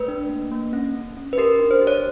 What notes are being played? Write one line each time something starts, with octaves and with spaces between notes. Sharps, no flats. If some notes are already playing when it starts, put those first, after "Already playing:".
Already playing: A3 B4
D4
A#3
A#3
C#4
C#4
C#4
B4
G4 A#4
D4
C5
G4
C#5